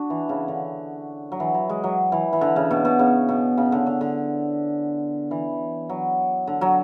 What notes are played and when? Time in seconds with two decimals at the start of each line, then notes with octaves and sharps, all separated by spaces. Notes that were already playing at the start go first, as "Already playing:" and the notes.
Already playing: D4 F#4
0.10 E3
0.29 C#3
0.48 D3
1.32 F#3
1.40 E3
1.54 F#3
1.69 G#3
1.84 F#3
2.12 E3
2.33 E3
2.41 D3
2.56 C#3
2.71 B2
2.85 B2
2.99 C#3
3.28 B2
3.58 C#3
3.72 D3
3.86 D3
4.01 D3
5.31 E3
5.89 F#3
6.47 D3
6.61 F#3